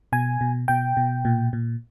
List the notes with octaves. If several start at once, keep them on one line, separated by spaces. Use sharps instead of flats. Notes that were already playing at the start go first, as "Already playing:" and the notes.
B2 G#5
B2
B2 G5
B2
A#2
A#2